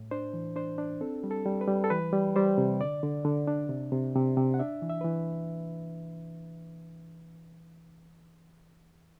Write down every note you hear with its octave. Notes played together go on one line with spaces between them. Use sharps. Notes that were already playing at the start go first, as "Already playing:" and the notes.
Already playing: A2
D4 C5
E3
D4 C5
D4
C4 A4
G3
A4
G3
B4
G3
A4
E3 B4
G3
G3 C5
C3
D3 D5
D3
D3
D4
C3
C3
C3
C3
F#5
D4 E5
E3
E5
E3 B4